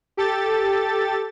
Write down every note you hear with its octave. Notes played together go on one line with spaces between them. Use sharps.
G4 A4 A6